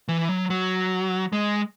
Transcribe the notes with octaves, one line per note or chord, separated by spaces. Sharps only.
E3
F#3
F#3
G#3